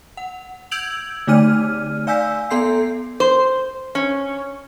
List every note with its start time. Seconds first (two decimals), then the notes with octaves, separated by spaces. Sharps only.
0.17 F#5
0.71 E6 G6 G#6 D7 F7 F#7
1.27 D3 A3 D#4 D5 F6 D#7
2.07 D5 F5 G#5 E6 G6 B6
2.50 B3 A4 C6 G6 C7
3.20 C5
3.95 C#4